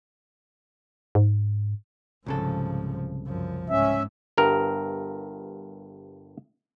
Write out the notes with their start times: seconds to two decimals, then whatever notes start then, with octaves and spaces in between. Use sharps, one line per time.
1.15 G#2
2.26 C2 G#2 C#3 F3 A4
3.27 F#2 F3
3.70 G#2 C#4 E5
4.37 G1 G2 A#4